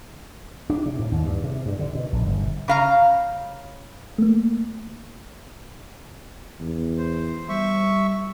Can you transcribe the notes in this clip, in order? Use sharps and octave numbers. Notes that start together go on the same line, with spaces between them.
D4
C3
A2
D#2
G2
C3
G2
D3
B2
A#1
G1
C#3 F5 A#5
A3 A#3
E2
C5
G3 E5 C#6